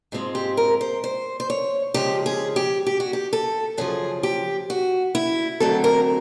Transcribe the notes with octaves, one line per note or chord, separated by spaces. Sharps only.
G#2 F3 G#3 C4
G4
A#4
C5
C5
C5
C#5
C#3 F3 G#3 C#4 G4
G#4
G4
G4
F#4
G4
A4
F#2 C#3 F3 G#4
G4
F#4
E4
F2 D3 F#3 A3 C4 A4
A#4